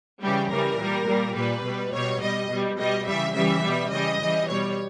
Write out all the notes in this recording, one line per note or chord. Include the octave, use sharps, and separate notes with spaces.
C#3 E3 G3 G4
C#3 E3 G3 A#4
A#2 G3
A#2 G3
A#2 G3 B4
B2 G3
B2 G3 C#5
B2 G3 D#5
B2 G3
B2 G3 D#5
C#3 E3 G3 E5
C#3 E3 G3 E5
B2 G3
C#3 E3 G3 D#5
C#3 E3 G3
B2 G3 C#5